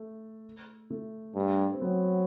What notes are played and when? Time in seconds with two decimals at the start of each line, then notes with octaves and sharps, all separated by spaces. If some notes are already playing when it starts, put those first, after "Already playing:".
Already playing: A3
0.90 A3
1.35 G2
1.73 C4
1.81 F#3 B3